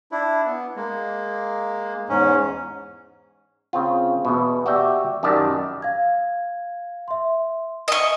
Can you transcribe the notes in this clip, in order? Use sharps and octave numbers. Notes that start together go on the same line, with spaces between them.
D4 E4
B3
G#3 A#3
E2 G#2 C#4
C#3 C4 F4
E2 B2
F#4 G4 D5 E5 G5
F#2 D#3 G4 D5 A5
F5 G#6
E5 C6
D#5 E5 G#5 C#6